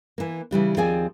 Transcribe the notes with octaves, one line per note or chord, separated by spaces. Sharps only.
E3 A#3
C#3 E3 G3 D4
D#2 F3 C4 G#4 D5 G#5